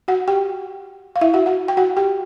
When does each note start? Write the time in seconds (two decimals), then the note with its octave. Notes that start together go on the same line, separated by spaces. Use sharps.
0.08 F#4 F#5
0.28 G4 G5
1.16 F5
1.21 E4 E5
1.34 F#4 F#5
1.46 F#4 F#5
1.68 G5
1.77 F#4 F#5
1.97 G4 G5